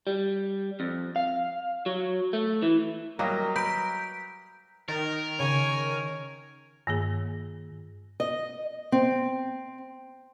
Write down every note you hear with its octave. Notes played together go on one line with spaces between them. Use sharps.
G3
F2
F5
F#3
A3
E3
F#3 G3 A#3 A#4 D#5
B4 A#5 G6 B6 D7
D#3 A#4 A6
C#3 C#5 G#5
G2 D#3 A#3 G#4
D#5
C4